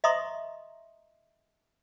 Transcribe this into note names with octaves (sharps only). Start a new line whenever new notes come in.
D#5 E5 A#5 C6 C#6 D#6